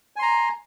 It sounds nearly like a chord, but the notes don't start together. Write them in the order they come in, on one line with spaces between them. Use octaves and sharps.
G#5 C6 A#5